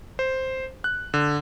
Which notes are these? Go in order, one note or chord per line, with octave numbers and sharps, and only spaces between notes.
C5
F#6
D3